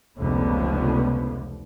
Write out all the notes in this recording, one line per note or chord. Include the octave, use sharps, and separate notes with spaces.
F1 C#2 D3 F3 B3